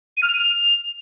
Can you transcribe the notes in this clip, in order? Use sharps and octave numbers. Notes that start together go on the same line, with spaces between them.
D#7
F6
F7
D#7
F7